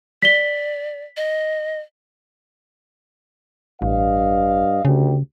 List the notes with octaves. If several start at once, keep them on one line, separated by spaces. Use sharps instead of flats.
D5 B6 G7
D#5
A1 G2 D#5 F5
D2 C#3 G4